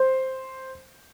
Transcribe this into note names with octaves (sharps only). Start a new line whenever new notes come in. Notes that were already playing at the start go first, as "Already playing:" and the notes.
Already playing: C5